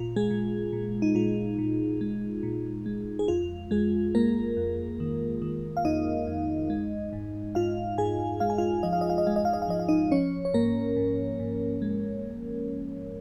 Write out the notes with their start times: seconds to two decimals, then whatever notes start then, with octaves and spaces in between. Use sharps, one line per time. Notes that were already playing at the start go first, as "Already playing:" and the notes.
Already playing: A#2 F4
0.16 G#3 G#4
0.31 A#2
0.73 A#2
1.02 D#4
1.15 A#2 F4
1.58 A#2
2.01 G#3
2.43 A#2
2.86 G#3
3.19 G#4
3.28 F2 F4
3.71 F2 G#3 G#4
4.14 G#3 A#3 A#4
4.57 F2
5.00 D#3
5.42 D#3
5.77 F5
5.85 F2 D#4 D#5
6.27 F2
6.70 G#3
7.13 G#2
7.55 G#2 F4 F5
7.98 G#2 G#4 G#5
8.40 G#3 F5
8.50 G#5
8.58 F4 F5
8.83 F3 D#5
8.93 F5
9.01 D#5
9.10 F5
9.18 D#5
9.27 G#3 F5
9.36 D#5
9.45 F5
9.53 D#5
9.62 F5
9.68 F3 D#5
9.79 F5
9.88 D#4 D#5
10.11 F3 C#4 C#5
10.45 C#5
10.54 G#2 A#3 A#4
10.96 G#2
11.40 G#2
11.82 G#3